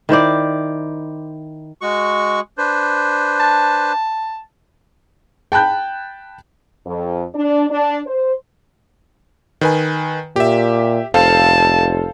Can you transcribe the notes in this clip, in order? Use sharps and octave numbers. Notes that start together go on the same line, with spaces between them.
D#3 E4 C5 D5
G#3 F#4 C#6
D4 B4 C5
A5
G5 A5 B5 F#6 G6
F2
D4
D4
C5
D#3 B4 G#5
A#2 G4 E5
F1 A4 C5 F5 A5